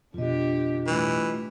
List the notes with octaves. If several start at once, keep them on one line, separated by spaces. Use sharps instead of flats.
F2 B2 D3 D4 F4 G4 D#5
A2 E3 G3